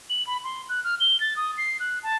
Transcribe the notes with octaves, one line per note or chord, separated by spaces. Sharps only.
F#7
B5
C6
F#6
F6
G7
A6
D#6
C7
F#6
A5